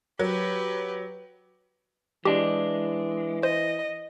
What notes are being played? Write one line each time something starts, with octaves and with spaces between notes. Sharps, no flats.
F#3 G4 B4
E3 G#3 D4 G4
C5 D#5